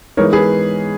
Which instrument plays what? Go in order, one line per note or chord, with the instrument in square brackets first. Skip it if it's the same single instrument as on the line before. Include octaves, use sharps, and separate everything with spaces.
[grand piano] E3 G#3 B3 D#4 A#4 C#5
G#4 B4